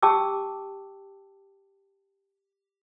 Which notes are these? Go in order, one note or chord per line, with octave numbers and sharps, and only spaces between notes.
G4 G5 A5 D6 E6